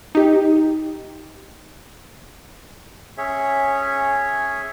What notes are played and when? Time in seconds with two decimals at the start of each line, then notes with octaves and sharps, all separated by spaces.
0.15 D#4 G4
3.18 C#4 G#4 C#5 E5